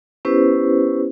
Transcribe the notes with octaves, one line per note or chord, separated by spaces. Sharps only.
B3 C#4 E4 G4 B4 C5